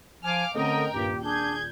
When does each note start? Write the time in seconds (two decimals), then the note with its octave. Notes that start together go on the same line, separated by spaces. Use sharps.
0.23 F3 F5 G#5 D6 F6
0.55 D3 A3 C4 C#4 A#4 D#5 G5
0.93 D#1 G2 A#2 G4
1.24 D4 G#4 G6 G#6